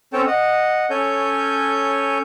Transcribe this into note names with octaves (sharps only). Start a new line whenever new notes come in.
C4 C#4 A4 C#5 G5 A5
D#5 F#5
C#4 A4 C#5 G#5 G6